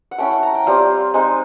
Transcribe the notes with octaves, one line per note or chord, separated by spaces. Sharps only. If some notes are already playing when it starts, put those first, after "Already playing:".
F#5
A3 C#4 E4 G5
F#5
A#5
G5
G3 C4 F4 F5
G#3 C4 D#4